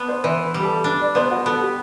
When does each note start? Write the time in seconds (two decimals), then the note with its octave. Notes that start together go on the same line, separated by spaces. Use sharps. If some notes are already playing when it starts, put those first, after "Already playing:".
Already playing: B3 D4
0.09 C5
0.24 E3 C5
0.44 B4
0.54 G3
0.60 G4
0.64 A4
0.84 D4 B4
1.00 D5
1.15 B3 C5
1.31 F#4
1.46 B3 A4
1.61 G4